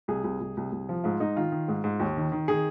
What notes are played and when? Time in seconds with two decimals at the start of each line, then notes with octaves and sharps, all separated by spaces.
0.08 C2 G#4
0.24 C2
0.41 C2
0.57 C2
0.72 C2
0.89 F3
1.04 G#2 F4
1.20 G#2 D#4
1.37 D#3 F4
1.52 D#3
1.68 G#2
1.84 G#2
2.00 D#2
2.17 D#3
2.32 D#3
2.48 D#3 G#4